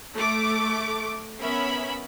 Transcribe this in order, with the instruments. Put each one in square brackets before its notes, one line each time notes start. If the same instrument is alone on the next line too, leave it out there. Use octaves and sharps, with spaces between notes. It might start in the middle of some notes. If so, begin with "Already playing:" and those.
[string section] A3 D6
B3 C#4 A#4 E5 B5